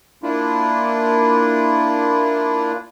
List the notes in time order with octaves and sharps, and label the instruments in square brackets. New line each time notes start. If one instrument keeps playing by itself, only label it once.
[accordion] A#3 D4 E4 F4